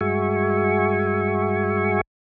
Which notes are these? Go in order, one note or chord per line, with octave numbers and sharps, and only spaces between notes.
G2 G#3 F#4 E5 G#5 C#6